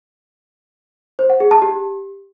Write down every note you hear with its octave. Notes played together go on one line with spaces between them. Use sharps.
C5
F#5
G#4
A5
G4